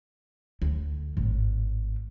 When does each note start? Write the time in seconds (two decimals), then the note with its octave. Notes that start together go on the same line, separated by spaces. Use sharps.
0.62 D2
1.17 G#1 A2